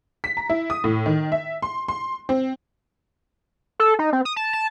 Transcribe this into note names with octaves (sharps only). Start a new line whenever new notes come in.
B6
A#5
E4
D#6
A2
D#3
E5
C6
C6
C4
A4
D#4
C4
D#6
A5
A5